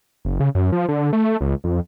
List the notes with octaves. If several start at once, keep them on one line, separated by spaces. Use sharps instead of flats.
F#1
C#3
F#2
F3
D3
A3
C#2
F2